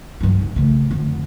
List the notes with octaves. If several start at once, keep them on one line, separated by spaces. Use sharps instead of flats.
G2 F#3
F1
C#3 A3
F2 D3